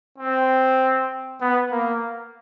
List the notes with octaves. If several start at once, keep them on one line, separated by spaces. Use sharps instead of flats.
C4
B3
A#3